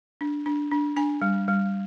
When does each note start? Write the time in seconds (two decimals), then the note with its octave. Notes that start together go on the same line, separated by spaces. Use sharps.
0.21 D4
0.46 D4
0.71 D4
0.96 D4 G#5
1.22 G3
1.48 G3